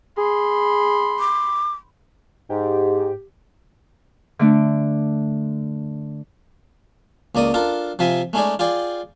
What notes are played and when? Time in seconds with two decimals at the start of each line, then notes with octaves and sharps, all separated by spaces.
0.18 G#4 B5 C6
1.20 D6
2.50 G#2 G4
4.39 D3 A3 D4
7.35 C#2 A#3 D5 D#5 D#6
7.54 D4 F4 A4 A#4
7.99 C3 F3 F4 E5 G#5
8.33 G#3 A3 C#4 D#4 G#4 D5
8.59 F4 G#4 D5 G5